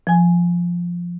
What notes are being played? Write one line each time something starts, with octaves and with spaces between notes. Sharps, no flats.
F3 G#5